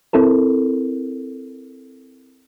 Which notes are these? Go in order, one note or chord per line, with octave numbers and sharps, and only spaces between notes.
C4 E4 A4 A#4